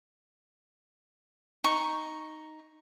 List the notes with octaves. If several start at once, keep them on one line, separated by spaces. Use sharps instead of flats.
D#4 C#6